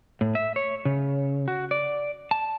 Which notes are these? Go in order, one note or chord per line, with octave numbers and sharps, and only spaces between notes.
A2
E5
C#5
C#3
F#4
D5
A5